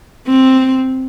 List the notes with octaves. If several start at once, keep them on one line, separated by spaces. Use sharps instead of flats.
C4